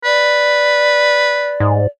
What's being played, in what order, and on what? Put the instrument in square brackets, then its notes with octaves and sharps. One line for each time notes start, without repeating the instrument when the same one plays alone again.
[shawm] B4 [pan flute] D5
[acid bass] G#2